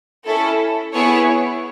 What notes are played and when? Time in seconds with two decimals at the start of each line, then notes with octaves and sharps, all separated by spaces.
0.25 C#4 E4 A4
0.93 B3 E4 G#4 C#5